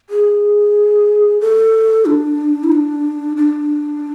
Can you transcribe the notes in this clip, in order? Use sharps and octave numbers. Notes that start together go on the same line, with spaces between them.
G#4
A4
D4
E4
D4
D4